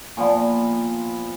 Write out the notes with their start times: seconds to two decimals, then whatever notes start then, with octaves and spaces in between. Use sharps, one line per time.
0.17 A#2 F3 B3